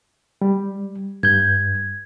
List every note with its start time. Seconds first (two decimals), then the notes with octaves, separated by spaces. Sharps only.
0.41 G3
1.23 G2 G6 G#6